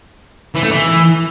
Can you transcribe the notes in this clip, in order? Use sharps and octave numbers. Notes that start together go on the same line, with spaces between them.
E3
A3
E3